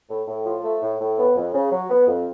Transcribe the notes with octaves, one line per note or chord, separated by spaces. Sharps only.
A2
A2
F3
A3
A2
A2
B3
F2
C#3
F#3
B3
F2